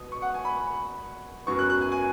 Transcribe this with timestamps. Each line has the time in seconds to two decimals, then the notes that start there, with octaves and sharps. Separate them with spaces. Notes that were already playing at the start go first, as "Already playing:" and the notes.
Already playing: B2 B3 D#6
0.12 C#6
0.22 F#5
0.34 G#5
0.45 B5
1.46 F#2 F#3 B3 C#6
1.59 F#6
1.70 F#6
1.81 G#5
1.92 G#5